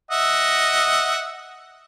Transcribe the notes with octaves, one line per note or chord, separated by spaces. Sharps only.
D#5 E5 F#5